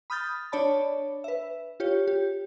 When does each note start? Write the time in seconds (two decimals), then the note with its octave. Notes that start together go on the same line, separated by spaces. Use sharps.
0.10 B5 D#6 F6 G6 A6
0.52 D4 C#5 D5 A5 B5
1.24 B4 E5
1.80 F4 G4 C#5
2.07 G4